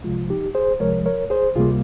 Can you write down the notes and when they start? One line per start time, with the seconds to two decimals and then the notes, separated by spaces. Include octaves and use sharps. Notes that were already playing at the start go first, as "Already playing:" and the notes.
0.04 C2 C3 F3 G#3 F4
0.30 D#4 G4
0.55 G#4 C5
0.80 C2 C3 F3 G#3 A#4 C#5
1.06 A#4 C#5
1.30 G#4 C5
1.56 C#2 C3 G3 A#3 F4 G#4